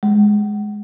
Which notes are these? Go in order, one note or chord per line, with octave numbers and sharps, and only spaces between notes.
G#3